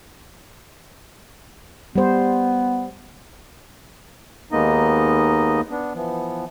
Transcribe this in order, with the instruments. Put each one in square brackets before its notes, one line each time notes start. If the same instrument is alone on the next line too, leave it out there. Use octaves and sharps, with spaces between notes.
[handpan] G3 C5 [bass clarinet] B3
[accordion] D#2 G#3 A#3 B3 D#4 D#5
B3 D4
E3 F3 B3